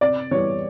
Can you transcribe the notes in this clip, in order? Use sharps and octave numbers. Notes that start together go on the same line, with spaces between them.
C3 D5
E3 G3 C#5